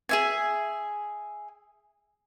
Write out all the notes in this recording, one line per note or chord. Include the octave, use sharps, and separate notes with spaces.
G#4 E5 G#5